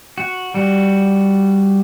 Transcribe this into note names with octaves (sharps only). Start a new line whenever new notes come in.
F#4
G3 F#4